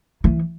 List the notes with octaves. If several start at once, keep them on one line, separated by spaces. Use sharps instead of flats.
E3